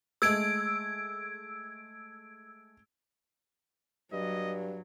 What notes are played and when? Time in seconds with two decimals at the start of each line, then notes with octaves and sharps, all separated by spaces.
0.22 G#3 A3 E6 G#6 D7
4.13 G2 F#3 D#5